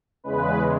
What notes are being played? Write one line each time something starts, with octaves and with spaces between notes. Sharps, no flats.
E2 C#3 G#3 B4